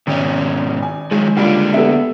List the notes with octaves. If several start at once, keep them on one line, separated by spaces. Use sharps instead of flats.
G#1 G#2 B2 C#4
G#5
D#3 F3 F#3 G#3
C#2 D3 G3 A#3 D4 F4
G3 B3 A4 E5